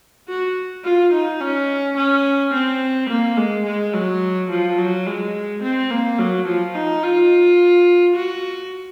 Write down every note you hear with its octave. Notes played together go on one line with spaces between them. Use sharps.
F#4
F4
D#4
C#4
C#4
C4
A#3
G#3
G#3
F#3
F3
F#3
G#3
C4
A#3
F#3
F3
D#4
F4
F#4